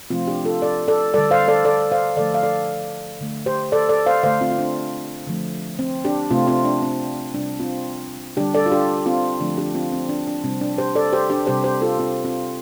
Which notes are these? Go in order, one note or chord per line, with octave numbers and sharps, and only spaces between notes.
C3 F3 A3 C4 F4
D4 G4
F4 A4
A4 D5
A4 D5
D3 G3 A4 D5
C5 F5
A4 D5
A4 D5
C5 F5
D3 F3 A3 A4 D5
F5
A4 D5
D3 A3
G4 C5
A4 D5
A4 D5
C5 F5
D3 A3 C5 F5
C4 F4
F4
D4
D3 F3 A3
C4
D4 G4
C3 A3 C4 F4
C4 F4
D4
C4
C3 G3 D4
C4 F4
D3 G3 D4 G4
A4 D5
F4
D4 G4
C4 F4
D3 F3 A3 D4
D4 G4
C4 F4
C4
D4
D4
C3 G3 C4
D4
G4 C5
A4 D5
G4 C5
D4 G4
C3 G3 G4 C5
G4 C5
F4 A4
C4 F4
C4 F4